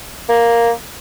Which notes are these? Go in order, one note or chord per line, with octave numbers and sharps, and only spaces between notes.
A#3